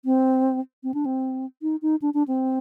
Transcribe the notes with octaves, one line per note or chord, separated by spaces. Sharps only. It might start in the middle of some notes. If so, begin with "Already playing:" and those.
C4
C4
D4
C4
D#4
D#4
D4
D4
C4